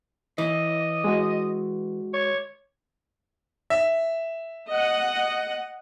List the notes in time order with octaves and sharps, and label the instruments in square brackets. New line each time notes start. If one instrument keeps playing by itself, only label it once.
[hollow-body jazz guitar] E3 [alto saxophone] D#5
[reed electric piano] G#3 F#4
[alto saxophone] C#5
[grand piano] E5
[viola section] D#5 F#5